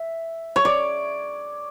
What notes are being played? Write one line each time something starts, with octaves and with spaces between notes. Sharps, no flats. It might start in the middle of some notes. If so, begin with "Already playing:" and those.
Already playing: E5
C#5
D5